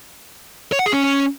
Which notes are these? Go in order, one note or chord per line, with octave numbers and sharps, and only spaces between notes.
C#5
F#5
G#4
C#4